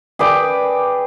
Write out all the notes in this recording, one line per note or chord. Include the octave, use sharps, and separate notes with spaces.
G#4 B4 D5 G5